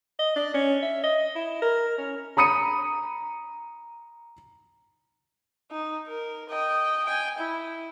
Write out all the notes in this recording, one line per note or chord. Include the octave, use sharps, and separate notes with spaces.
D#5
D4
C#4
E5
D#5
E4
A#4
C#4
A#5 B5 D#6 C#7 D#7
D#4
A#4
D#5 G5
G5 G#5
E4